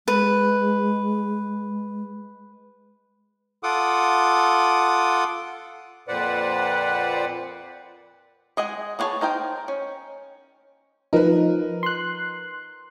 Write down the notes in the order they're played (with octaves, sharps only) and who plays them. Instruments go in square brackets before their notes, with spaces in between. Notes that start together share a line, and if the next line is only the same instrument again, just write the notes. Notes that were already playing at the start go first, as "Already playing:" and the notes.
[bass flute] G#3 [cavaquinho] B4
[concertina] F4 A4 F#5 D6 D#6
[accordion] F2 A#2 B4 C5 D5 F#5
[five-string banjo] G#3 D#5 F#5 G#5
B3 D4 G#4 C#5 A5
D#4 A#4 C5 G5
C#4
[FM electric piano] F3 D#4 [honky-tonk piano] A#4 B4
[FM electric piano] C6 F#6